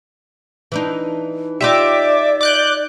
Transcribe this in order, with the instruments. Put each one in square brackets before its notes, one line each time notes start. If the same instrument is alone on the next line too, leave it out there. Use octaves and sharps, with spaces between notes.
[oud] E3 D4 D#4
[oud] D#4 F4 G4 [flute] D5 [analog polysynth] E5 D6
[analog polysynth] D6 F#6 G6